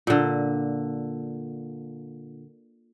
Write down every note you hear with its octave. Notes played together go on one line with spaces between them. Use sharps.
A#2 D3